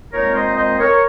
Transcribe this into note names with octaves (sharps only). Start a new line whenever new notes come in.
A#2 G#3 C4 D#4 A#4 C#5
C5 D#5
C5 D#5
A#4 C#5